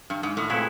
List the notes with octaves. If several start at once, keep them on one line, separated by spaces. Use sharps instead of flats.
G2
G#2
A2
A#2 A3 C4 E4 G#4 B4